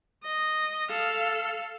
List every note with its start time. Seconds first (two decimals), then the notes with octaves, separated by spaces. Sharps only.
0.24 D#5
0.89 A4 F5